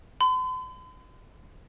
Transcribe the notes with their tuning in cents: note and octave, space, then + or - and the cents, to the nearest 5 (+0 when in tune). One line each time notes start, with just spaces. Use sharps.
C6 -45